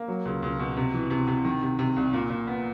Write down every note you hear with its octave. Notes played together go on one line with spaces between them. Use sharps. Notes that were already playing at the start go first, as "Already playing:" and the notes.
Already playing: A#3
F#3
C#2
C#2
B2
C3
E3
C3
C3
D#3
C3
C3
C2
A#2
A#2
B3